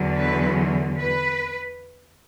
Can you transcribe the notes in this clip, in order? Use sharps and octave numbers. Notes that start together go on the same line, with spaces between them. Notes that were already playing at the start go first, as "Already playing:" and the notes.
Already playing: E2 D3 F#3
B4
B4